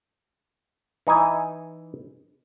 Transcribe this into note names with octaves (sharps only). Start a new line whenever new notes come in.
E3 D#4 E4 G#5